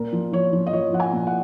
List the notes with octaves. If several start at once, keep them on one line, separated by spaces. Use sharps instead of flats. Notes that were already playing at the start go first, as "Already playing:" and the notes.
Already playing: A#2 A#4
F3
F3 C#5
F3
D#5
F3 C#5
F3 F#5
G#5
A#2
F#5